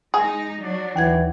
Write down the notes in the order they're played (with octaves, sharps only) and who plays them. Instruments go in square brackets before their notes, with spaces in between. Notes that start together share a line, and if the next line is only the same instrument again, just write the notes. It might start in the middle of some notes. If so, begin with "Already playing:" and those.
[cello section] G#3 D#4 [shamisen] G#4
[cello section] F#3 D4
[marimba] D#2 F#5 G#6 [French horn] E3